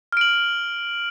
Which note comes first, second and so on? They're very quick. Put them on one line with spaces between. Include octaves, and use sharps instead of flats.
F6 D7 F#7